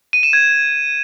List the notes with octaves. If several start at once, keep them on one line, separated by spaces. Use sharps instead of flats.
D#7
E7
G#6